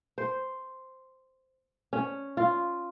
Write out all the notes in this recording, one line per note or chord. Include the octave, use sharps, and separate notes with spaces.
C5
C#4
F4